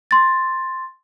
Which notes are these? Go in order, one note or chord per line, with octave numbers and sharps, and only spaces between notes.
C6 A6